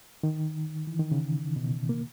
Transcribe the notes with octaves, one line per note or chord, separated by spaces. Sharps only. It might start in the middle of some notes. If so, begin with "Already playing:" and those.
D#3
E3
D#3
C#3
B2
A#3